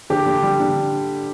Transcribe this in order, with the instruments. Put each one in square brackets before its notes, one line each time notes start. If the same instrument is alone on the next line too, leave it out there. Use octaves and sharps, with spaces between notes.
[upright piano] D3 G4
D3
G3
D3